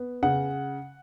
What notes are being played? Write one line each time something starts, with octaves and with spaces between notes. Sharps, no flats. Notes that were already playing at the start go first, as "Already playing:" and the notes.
Already playing: B3
C#3 F#5